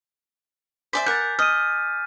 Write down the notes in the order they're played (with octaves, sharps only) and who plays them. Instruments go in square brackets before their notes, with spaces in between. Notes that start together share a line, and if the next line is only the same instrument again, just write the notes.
[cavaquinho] C5 D5 E5 [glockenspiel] G#5 D6 B6
[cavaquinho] A#4 F#5 [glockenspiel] G6 A6
[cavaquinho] D#5 [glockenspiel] F6 D#7